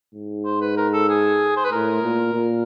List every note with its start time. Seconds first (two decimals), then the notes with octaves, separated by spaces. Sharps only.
0.14 G#2
0.45 C5
0.61 B4
0.77 A#4
0.93 A4
1.09 G#4
1.57 C5
1.64 B4
1.71 A2 A#4
2.03 A#2
2.34 A#2